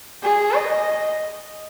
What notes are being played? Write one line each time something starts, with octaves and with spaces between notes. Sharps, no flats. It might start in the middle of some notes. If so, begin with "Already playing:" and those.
G#4
D#5